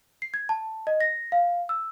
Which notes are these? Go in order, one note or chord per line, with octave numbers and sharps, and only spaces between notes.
C7
G#6
A5
D#5
A#6
F5
E6